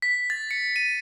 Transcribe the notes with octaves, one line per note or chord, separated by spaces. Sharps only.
B6
A6
C#7
D#7